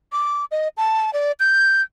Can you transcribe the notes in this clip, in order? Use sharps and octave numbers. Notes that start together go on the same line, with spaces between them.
D6
D#5
A5
D5
G6